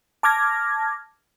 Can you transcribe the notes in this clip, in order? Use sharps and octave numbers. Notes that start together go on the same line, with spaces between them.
A5 D6 F6 G#6 A#6